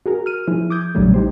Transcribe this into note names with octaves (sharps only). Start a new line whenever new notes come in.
F#4 G#4 A#4
F6 D#7
F3 E4 G#4
D6 D#6 G6 G#6
A#1 C#3 F#3 G3 A3
D#4 G4 C5